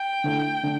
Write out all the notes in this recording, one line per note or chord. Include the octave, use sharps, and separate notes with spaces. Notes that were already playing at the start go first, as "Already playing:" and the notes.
Already playing: G5
D3 A3 E4
D3 A3 D4